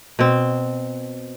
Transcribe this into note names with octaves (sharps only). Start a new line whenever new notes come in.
B2 C4